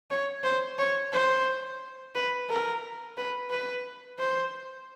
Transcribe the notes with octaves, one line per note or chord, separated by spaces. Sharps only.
C#5
C5
C#5
C5
B4
A#4
B4
B4
C5